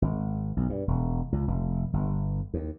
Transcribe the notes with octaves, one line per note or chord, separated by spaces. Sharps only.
G#1
B1
G2
E1
C#2
F1
G1
D#2